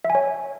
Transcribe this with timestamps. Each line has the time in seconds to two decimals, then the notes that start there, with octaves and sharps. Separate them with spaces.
0.05 E5
0.10 G#5
0.15 C#5